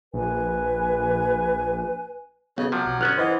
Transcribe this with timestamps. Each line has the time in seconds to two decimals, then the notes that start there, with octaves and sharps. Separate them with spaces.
0.14 A#1 B4 G#5
2.58 B1 C#3 B3
2.72 C3 F3 F#3
2.86 B1
3.01 G1 B3 C#4 F6 F#6
3.18 E3 C5 D#5 F#5